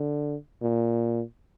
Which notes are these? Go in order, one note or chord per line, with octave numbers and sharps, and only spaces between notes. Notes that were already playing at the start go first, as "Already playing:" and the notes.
Already playing: D3
A#2